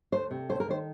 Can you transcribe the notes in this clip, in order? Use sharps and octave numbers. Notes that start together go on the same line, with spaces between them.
D2 C5
C3
D2 C5
A#4
D#3 C5